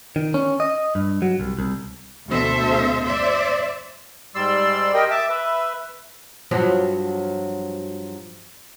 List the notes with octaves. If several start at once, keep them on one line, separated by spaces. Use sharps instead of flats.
D#3
C#4
D#5
G2
F#3
C2
C2
D2 B2 A3 A4 C5 E5
C5 D5 E5
G#2 G3 D5 C6 E6
G4 A#4 D#5 G5
E5 A5 D6
B4 E5
G2 F3 F#3